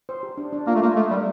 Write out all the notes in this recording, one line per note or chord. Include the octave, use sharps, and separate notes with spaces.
C5
G4
D4
D4
A#3 F4
A3
A#3 F4
A3 D#5
G3 A#4